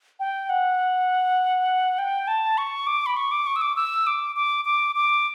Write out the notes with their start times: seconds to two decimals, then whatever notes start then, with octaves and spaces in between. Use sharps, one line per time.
0.20 G5
0.49 F#5
1.99 G5
2.28 A5
2.58 C#6
2.87 D6
3.06 B5
3.17 C#6
3.31 D6
3.47 C#6
3.56 E6
3.62 D6
3.76 E6
4.07 D6
4.36 D6
4.65 D6
4.95 D6